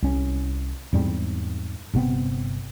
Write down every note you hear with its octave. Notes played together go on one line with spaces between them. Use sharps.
C2 C#4
E2 G#2 G3 C4
G1 C3 B3 C4